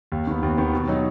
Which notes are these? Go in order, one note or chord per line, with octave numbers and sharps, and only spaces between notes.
D#2
D#3 B3
D#2
D#3 B3
B2
F#3 D#4